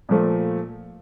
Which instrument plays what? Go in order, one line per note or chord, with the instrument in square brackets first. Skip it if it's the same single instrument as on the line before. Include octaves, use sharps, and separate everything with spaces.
[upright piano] A#2 F3 A3